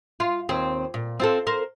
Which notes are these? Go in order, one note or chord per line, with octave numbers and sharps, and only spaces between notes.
F4
D#2 C4
A#2
C4 F4 A4
A#4 C5